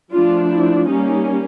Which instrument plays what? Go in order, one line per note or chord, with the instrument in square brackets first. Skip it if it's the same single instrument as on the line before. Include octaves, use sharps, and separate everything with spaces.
[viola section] F3 A3 D4 F4
E4
G3 A#3 C#4 D#4